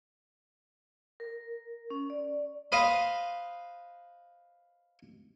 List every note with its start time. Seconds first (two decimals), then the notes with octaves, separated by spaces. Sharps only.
1.20 A#4
1.90 C#4
2.10 D5
2.72 B4 C5 D#5 F5 B5